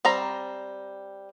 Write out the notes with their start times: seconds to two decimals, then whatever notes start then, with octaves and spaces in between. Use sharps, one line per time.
0.05 G3 C4 A#5